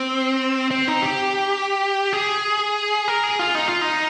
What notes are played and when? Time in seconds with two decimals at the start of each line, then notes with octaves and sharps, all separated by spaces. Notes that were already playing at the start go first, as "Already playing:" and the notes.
Already playing: C4
0.71 C4
0.88 D#4
1.02 G4
2.13 G#4
3.08 A#4
3.24 G#4
3.39 F4
3.55 D#4
3.68 F4
3.81 D#4